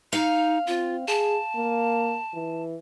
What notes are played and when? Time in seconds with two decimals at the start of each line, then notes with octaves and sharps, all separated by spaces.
0.13 D#4 F5
0.67 C4 F4
1.08 G#4 A5
1.56 A#3
2.34 E3